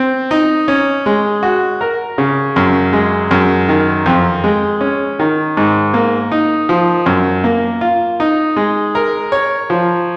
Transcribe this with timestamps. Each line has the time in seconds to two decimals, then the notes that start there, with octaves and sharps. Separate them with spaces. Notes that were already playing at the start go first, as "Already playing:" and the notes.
Already playing: C4
0.31 D#4
0.68 C#4
1.06 G#3
1.43 F#4
1.81 A#4
2.18 C#3
2.56 F#2
2.93 G#3
3.31 F#2
3.69 D#3
4.06 F2
4.44 G#3
4.81 C#4
5.19 D#3
5.57 G#2
5.94 A#3
6.32 D#4
6.69 F3
7.06 F#2
7.44 A#3
7.81 F4
8.20 D#4
8.56 G#3
8.95 A#4
9.32 C#5
9.70 F3